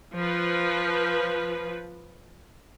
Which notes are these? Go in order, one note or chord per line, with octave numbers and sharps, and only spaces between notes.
F3 B4